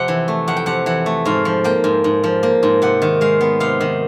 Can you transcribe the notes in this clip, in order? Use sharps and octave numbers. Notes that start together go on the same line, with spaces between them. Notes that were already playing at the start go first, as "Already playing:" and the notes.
Already playing: F2 C3 F#5
E3
A3
F2 F#5
G5
C3 F#5
E3 F#5
A3
G#2 F5
F3
A#3 G5
G#2
G#2
F3
A#3
G#2
C3 F#5
D#3
G#3 F5
B3
C3 F5
D#3